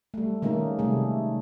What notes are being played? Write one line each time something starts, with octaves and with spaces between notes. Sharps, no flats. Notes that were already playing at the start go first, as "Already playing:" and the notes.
G3 A3
D#3 G#3 A#3 C#4 D#4
C3 G3 A3 G#4